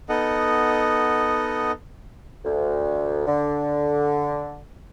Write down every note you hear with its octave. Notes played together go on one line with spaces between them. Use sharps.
B3 D#4 A4 D#5 F#5
D2
D3